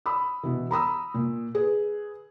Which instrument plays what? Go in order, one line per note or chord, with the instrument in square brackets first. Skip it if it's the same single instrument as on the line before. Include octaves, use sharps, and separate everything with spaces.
[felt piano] B5 D#6 E6
B2 E3
A#5 B5 D#6 E6
A#2
G#4 B4